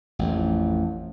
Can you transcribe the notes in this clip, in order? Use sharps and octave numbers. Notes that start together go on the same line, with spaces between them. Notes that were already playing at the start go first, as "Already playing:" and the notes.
A1 F2